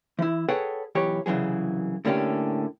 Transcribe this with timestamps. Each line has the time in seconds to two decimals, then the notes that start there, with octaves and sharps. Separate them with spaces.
0.19 E3 E4
0.49 G#4 A4 B4 C#5 F#5 G5
0.95 B1 E3 G4 C#5
1.26 C2 C#3 E3 F#3 G#4
2.05 A2 D3 A#3 C#4 E4 G4